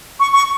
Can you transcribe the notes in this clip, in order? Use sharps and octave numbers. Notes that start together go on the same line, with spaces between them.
C#6
C#6